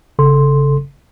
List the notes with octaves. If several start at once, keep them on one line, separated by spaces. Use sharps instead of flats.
G1 C#3 A4 C6